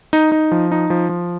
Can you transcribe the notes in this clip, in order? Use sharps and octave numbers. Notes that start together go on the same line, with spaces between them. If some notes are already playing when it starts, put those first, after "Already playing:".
D#4
D#4
F3
D#4
F3
F3